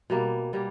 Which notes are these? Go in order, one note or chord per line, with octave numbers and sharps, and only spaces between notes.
B2 G3 A#3
B2 G3 A#3